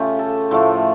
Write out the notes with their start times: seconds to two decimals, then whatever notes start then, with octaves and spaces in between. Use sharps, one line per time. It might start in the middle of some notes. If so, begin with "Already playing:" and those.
Already playing: C#3 A3 F4 G4
0.19 A4
0.51 A2 F3 A3